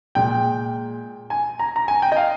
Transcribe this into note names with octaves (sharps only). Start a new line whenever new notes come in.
A#2 G#3 G5
G#5
A#5
A#5
G#5
G5
D#5
F5